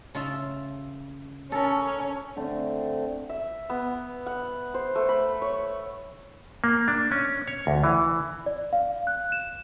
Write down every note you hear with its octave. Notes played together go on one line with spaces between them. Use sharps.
C#3 F4 E5
C#4 A4 A#4
D3 A3 C4
E5
B3
F#5
C5
A3
B5
C#5
A#3
D4
C#4
C#5
D2
E3
D5
F5
F#6
E7